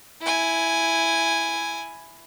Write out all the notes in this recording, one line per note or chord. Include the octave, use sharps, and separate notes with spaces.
E4 G#5